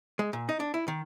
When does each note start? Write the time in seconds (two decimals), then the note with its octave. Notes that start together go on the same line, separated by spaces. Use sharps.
0.19 G#3
0.33 A#2
0.49 D#4
0.60 D4
0.74 E4
0.88 D#3